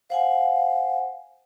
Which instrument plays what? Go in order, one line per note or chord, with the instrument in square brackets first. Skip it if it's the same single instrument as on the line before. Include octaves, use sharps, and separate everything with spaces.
[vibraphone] C5 F#5 G#5 [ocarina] F5